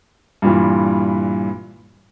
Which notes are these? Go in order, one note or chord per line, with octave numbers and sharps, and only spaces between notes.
G2 A#2 E3